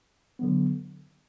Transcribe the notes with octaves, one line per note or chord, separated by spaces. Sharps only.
D3 F#3 B3